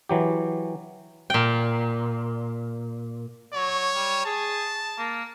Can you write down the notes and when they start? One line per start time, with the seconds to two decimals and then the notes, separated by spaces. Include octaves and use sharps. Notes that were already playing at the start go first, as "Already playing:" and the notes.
0.09 E3 F#3 G4
1.30 A#2 G5
3.54 F#3 C#5
3.95 G3
4.26 G#4 A5
4.98 A#3